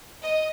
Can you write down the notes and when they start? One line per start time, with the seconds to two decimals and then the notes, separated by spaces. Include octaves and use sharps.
0.22 D#5